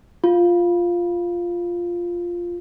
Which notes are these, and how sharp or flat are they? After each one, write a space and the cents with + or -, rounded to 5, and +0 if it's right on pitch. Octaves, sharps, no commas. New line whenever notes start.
F4 +0